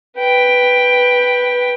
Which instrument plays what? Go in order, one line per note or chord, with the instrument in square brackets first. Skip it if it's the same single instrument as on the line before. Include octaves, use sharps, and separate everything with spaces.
[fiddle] B4 G5